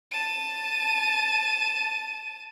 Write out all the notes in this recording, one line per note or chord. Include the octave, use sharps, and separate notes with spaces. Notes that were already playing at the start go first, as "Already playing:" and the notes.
A5 D#7